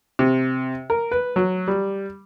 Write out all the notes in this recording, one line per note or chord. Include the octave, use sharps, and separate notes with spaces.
C3
A#4
B4
F#3
G3